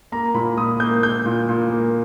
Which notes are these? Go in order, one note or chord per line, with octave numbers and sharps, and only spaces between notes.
A#3 A#5
A#2 B5
A#2 D#6
A#3 G6
A#3 G6
A#2
A#2
A#3